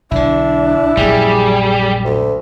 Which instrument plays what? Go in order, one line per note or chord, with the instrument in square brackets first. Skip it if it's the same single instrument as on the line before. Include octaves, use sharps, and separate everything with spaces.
[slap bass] B1 D3 [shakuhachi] D4 [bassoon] E4
[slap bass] A#1 F#2 A#3 [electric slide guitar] G3 [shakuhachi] G#4
[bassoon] D2